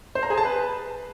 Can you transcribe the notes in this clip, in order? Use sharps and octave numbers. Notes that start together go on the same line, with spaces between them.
C5
A#5
G#4
A5
B4